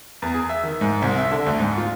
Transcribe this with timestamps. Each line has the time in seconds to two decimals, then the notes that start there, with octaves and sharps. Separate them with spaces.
0.22 E2
0.34 G#4
0.49 E5
0.63 D#3
0.81 G#2
1.02 C2
1.18 E5
1.31 D3
1.46 D2
1.59 G#2
1.77 F4